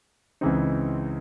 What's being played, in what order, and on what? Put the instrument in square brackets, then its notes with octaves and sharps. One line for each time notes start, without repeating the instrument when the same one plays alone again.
[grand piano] C#2 C#3 E3 C4 D#4